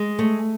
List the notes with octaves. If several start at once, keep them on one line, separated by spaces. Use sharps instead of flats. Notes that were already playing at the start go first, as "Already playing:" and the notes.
Already playing: G#3
A3